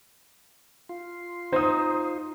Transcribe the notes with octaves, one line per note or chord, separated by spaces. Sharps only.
F4 C6
D#4 C5 D#6